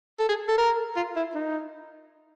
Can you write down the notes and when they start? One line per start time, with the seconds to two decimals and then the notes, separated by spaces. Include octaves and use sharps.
0.19 A4
0.29 G#4
0.48 A4
0.58 A#4
0.96 F4
1.16 E4
1.35 D#4